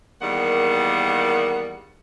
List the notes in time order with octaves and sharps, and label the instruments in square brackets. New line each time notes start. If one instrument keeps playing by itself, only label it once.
[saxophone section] E2 D#3 G3 A#3 F#5